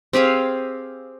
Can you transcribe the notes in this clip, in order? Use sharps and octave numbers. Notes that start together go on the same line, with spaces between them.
C4 G4 G#4 F5